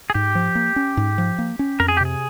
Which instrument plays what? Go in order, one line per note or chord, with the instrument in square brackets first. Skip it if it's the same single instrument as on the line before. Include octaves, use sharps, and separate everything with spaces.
[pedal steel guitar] G#4
[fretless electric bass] G#2 [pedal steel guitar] G4
[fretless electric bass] F3
A#3
C#4
G#2
F3
A#3
C#4
[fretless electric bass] F2 [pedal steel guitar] A#4
[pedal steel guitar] G#4
G4
[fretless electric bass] C3 [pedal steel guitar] G#4